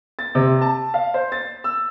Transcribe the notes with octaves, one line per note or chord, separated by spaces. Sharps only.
A6
C3
A5
F5
C5
A6
E6